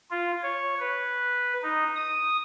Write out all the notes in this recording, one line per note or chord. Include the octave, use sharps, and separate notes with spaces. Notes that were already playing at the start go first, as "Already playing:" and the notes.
F4
C#5
B4
D#4
D#6